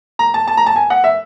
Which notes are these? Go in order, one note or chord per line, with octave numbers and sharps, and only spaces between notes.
A#5
A5
A5
A#5
A5
G#5
F#5
E5